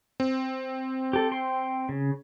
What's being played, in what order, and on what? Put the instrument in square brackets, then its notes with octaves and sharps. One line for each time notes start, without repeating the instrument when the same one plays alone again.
[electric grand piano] C4
[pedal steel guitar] G4 A4
G5 C6
C#3